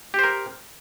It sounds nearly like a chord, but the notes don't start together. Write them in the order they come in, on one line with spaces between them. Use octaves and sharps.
G4 C5 A#4